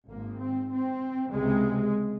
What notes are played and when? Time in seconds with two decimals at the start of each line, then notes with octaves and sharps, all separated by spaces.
0.09 G#1 G#2 A#3
0.40 C4
0.71 C4
1.32 C#2 C3 G#3